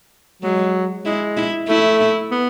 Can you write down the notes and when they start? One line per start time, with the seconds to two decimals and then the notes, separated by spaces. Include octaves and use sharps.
0.43 F#3 G#3
1.05 G#3 E4
1.37 E4
1.68 A3 E4
2.31 B3